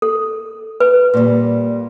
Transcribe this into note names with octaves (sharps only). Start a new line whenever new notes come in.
A4
B4
A#2 G3